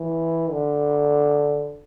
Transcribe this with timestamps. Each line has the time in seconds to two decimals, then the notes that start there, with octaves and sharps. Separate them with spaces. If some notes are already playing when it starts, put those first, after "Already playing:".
Already playing: E3
0.51 D3